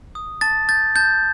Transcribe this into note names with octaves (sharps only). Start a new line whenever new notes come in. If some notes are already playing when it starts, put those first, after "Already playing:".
D#6
A5 A6
G6 A6
A5 G6